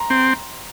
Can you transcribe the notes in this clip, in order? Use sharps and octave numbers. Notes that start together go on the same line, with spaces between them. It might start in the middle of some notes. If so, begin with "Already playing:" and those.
Already playing: A#5 C6
C4